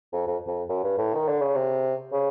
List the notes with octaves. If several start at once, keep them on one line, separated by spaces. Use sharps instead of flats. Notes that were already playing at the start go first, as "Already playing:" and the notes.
F2
F2
F2
F#2
G2
A2
D#3
D3
C#3
C3
C#3